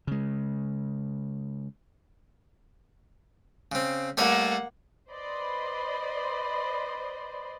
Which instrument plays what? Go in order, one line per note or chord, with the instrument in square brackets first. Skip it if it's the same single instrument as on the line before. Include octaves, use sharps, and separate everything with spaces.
[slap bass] C#3 G#3
[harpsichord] C#3 C4
[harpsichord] G3 A3 C#5 [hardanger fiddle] A#3 F#5
[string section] B4 C5 D5 D#5 B5 C6